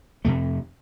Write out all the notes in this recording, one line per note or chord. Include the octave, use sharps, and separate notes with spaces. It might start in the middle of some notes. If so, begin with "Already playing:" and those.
F2 C3 A3